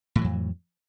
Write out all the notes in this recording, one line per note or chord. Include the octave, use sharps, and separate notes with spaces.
F2 A2 E3 F#3